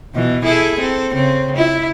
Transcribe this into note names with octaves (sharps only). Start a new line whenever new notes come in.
B2 E3
E4 G#4 A4
C4 A4
C#3 C4
E4